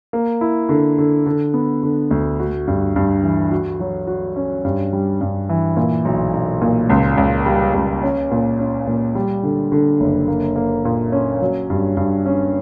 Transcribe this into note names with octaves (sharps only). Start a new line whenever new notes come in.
A#3
E4
D3
D3
D3
B3
D3
D2
F#4
G2
G2
E3
F#4
F#3
F#4
C#4
G2
G3
G2
E3
A#2
B1
B1
A#2
C#2
C#2
G3
C#2
C#4
A#2
C#4
A#2
G3
D3
D3
F#1
A#3
A#3
A#2
C#4
F#3
G2
G2
C#4